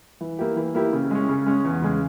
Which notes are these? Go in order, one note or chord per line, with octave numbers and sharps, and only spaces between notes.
E3
A#3 E4 G4
E3
A#3 E4 G4
C#3
G#3 C#4
C#3
G#3 C#4
E2
C#3 G#3